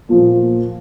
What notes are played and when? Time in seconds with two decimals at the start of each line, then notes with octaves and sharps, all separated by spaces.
0.09 A#2 F3 A#3